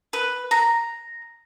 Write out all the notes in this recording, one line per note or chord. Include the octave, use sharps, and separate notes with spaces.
B4
A#5